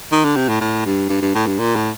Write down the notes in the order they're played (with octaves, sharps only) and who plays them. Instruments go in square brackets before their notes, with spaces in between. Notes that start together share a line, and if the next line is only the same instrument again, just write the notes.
[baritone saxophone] D#3
D3
C3
A2
A2
G2
G2
G2
A2
G2
A#2
A2